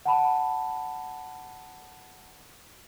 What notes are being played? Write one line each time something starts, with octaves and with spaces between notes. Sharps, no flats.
F#5 A5 B5